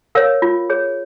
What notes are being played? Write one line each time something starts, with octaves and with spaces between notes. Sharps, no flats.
A#4 C#5 F5
F4
G#4 C#5